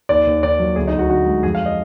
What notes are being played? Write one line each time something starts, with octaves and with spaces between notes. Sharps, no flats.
D#2 D5
D#2
D#3 D5
F#3
D2 G#4
D#4
D2
F#4
D3 F#4
G#3
F2 G#4
F5
D#5